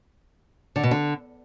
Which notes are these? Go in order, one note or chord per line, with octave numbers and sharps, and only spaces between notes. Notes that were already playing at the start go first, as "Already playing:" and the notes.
D3
B2
D3